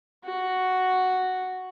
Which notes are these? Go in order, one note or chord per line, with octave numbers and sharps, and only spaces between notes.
F#4